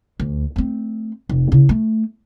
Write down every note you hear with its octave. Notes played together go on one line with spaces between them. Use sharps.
D2
A3 C4
F1
C#3 E4
A3